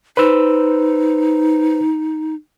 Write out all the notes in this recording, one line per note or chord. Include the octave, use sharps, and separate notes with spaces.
D#4 B4 C5 E6